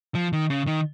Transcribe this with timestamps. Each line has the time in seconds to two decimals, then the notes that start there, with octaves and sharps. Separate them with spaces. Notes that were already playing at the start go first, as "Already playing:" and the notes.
0.15 F3
0.33 D#3
0.50 C#3
0.67 D#3